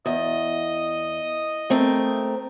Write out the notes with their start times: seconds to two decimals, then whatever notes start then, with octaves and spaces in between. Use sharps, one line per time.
0.06 E2 D#5
1.70 A3 C4 A#4